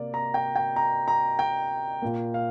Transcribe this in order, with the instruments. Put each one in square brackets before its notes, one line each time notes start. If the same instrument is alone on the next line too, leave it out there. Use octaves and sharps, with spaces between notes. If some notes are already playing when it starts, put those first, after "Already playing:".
Already playing: [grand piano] C3 A#3 D5
A#5
G5
G5
A#5
A#5
G5
A#2 A#3
F5